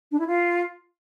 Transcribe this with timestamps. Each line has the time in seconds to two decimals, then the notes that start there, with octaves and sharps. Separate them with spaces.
0.11 D4
0.19 E4
0.27 F4